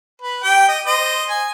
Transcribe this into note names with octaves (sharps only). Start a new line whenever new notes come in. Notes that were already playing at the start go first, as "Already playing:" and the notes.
B4
G4 G5
D#5
C5 D#5
G#5